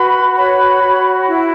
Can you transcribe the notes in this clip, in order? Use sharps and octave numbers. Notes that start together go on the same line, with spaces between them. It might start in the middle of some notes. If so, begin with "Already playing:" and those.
Already playing: F#4 B4 B5
C#5 B5
F#4
E4